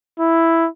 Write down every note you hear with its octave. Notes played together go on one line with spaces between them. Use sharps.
E4